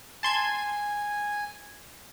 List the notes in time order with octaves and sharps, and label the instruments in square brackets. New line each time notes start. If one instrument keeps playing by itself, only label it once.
[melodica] G#5 [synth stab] A5 C6 G#6